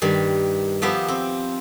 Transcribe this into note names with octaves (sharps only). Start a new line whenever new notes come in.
G2 D#3 G3
F3 B3 G4 E5
C4